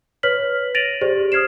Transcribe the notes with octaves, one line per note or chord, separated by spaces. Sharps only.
B4 C#5 F6 B6 F#7
A6 A#6 D7 D#7 F7 F#7
G4 G#4 C5 D5
D#6 F6 G#6 C7 E7